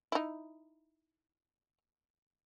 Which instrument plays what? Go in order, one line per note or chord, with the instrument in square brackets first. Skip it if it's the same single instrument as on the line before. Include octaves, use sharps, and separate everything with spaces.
[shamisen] D#4 E4